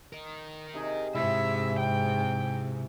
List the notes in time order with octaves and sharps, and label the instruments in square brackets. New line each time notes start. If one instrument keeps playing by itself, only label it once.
[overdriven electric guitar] A#4 D#5
[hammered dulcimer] C3 D#4 G#4
[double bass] G#2 [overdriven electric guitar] C3 [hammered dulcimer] E4 [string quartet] E5
[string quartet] G5